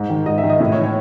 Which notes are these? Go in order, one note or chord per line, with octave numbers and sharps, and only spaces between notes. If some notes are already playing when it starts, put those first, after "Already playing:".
Already playing: G#2
D#3
G#2 D#5
E5
D#3
D#5
A2 D#5
C#5
E3
C#5